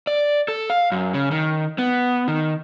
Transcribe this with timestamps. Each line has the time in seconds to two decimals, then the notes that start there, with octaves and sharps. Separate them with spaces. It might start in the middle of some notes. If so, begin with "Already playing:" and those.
0.07 D5
0.48 A4
0.70 F5
0.92 F#2
1.14 C#3
1.31 D#3
1.78 B3
2.28 D#3